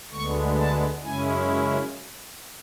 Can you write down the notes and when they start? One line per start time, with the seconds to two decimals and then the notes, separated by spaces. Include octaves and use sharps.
0.11 D2 D3 G#3 B3 C#6
0.57 A5
1.03 F#2 C#3 G#3 C#4 E4 G#5